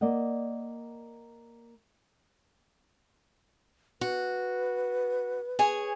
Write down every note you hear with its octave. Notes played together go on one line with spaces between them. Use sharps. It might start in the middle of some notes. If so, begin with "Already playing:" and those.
A#3 D5 D#5 F#5
F#4 B4
G#4 C#5 G#5